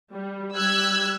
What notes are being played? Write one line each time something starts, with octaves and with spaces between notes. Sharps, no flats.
G3
G3 G4 E6 F#6 G#6